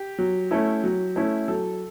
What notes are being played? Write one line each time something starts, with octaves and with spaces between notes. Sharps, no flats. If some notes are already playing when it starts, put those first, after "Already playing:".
Already playing: G4
F#3
A3 C#4 E4
F#3
A3 C#4 E4
F#3 A4